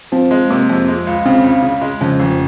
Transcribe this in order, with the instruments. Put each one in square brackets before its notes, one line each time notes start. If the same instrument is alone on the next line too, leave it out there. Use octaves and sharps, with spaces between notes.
[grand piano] F3 [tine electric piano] C4
[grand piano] G#3
[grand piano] C3 [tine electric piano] A#3
[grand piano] F2
G#3
C#2
[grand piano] C#3 [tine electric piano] C4
[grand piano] C#2
C#3
G#3
[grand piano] F2 [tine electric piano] C#3 C#4
[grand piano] F1